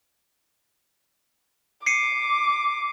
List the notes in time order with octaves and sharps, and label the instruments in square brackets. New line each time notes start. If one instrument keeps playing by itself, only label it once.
[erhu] D6 [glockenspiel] C7 C#7 D#7